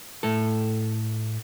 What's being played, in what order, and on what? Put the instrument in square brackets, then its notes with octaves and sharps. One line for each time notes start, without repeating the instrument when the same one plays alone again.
[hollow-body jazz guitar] A2 A3 A4